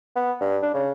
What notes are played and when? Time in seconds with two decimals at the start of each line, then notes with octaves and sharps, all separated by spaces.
0.16 B3
0.41 G2
0.63 D4
0.74 C#3